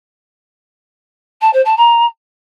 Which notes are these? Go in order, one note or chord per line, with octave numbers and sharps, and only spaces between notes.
A5
C5
A5
A#5